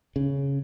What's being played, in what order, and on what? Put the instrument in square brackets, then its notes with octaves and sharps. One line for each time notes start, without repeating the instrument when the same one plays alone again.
[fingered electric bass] C#3